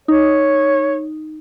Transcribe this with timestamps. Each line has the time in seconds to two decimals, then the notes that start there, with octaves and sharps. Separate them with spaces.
0.08 D#4 C#5